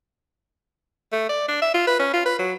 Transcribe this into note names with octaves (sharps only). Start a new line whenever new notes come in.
A3
D5
D4
E5
F4
B4
C#4
F4
B4
F#3